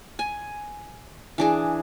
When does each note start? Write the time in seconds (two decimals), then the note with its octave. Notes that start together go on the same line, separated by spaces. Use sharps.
0.19 G#5
1.38 E3 D4 G#4